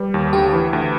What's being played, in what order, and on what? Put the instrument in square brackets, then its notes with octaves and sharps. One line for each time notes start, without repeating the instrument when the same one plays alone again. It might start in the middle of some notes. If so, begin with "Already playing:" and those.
Already playing: [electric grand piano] G3 [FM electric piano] B4
[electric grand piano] D#2
[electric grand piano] D2 [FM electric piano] G4
[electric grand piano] E3
D2